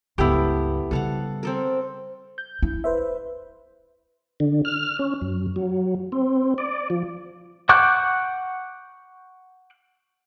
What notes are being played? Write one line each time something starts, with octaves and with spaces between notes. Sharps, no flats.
C#2 G2 B3 E4 G4 A4
C#3 G3 A4 F5 F#5
C4 A4 A#4
G6
E4
B4 C5 E5
D3
F6
C#4
F#2
F#3
C4
D5
F3
F#5 C#6 D6 F#6 G6